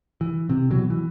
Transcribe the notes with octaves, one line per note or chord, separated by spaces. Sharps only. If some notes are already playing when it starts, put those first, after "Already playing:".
E3
C3
B2 E3 F#3
E3